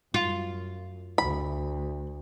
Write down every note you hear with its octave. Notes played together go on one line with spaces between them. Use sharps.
F#2 F4
D2 B5